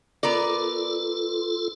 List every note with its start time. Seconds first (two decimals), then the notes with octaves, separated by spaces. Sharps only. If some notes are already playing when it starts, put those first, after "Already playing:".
0.23 B3 F4 A4 A#4 D5